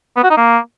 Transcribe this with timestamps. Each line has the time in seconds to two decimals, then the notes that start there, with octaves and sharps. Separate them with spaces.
0.17 B3
0.23 F#4
0.30 D#4
0.37 A#3